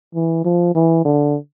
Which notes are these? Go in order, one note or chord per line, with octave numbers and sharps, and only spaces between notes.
E3
F3
E3
D3